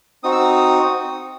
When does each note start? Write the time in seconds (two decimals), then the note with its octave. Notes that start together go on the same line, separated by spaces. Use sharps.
0.24 C4 D#4 F#4 D#6
0.32 E6
0.40 D#6